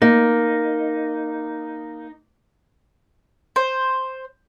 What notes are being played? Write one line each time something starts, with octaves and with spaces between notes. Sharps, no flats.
A#3 D#4
C5